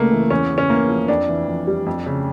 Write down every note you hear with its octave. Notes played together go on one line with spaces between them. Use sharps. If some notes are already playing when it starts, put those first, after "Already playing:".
Already playing: C#2 C#3 A3 A#3
E3
E2 C#4
C#3
C#4
E2 A#3
F3
F2 D4
E3
F2
G3
F2
C#3